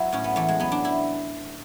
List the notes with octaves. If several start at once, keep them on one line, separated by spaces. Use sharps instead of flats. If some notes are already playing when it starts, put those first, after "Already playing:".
Already playing: F#3 E4 F#4
A2 C#4
B3
E2 A3
G#3
F#3 B3
D4
E4